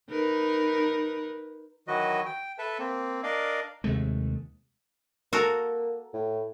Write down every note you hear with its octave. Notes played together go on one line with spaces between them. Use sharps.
D#4 A#4 B4
D#3 E3 F#3 F#4 B4 D#5
G5
A4 B4 E5 A5
A#3 C4
D4 A#4 D5 D#5 F5
D#2 C3 G#3 A3
A#3 F#4 A4 A#4
A2